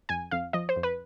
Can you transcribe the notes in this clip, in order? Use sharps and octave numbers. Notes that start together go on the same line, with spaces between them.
F2 G#5
F2 F5
F3 D#5
C5
F2
B4